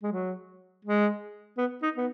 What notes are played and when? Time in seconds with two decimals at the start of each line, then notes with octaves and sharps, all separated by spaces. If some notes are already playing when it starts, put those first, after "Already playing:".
0.03 G#3
0.12 F#3
0.85 G#3
1.58 B3
1.82 D#4
1.97 B3